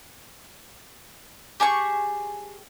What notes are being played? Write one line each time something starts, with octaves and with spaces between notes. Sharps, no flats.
G4 G#4 A5 C#6